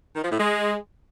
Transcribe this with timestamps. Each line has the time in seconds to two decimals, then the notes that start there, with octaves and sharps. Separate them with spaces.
0.16 D#3
0.23 F3
0.31 A2
0.39 G#3